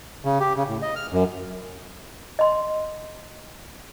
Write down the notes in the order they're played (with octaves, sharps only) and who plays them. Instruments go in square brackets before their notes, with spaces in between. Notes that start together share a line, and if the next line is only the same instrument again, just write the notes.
[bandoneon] C#3
G4
C#3
A2
D#5
F6
F#2
[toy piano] D#5 C6